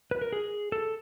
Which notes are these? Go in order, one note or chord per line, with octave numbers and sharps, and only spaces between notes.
B4
A#4
G#4
A4